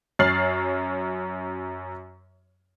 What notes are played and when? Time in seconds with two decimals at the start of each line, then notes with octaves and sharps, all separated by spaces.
0.19 F#2 C#5 F6 A6 C7 F#7